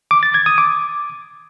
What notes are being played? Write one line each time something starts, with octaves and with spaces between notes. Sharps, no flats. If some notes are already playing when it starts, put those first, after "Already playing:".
D6
A6
G#6
D#6
D6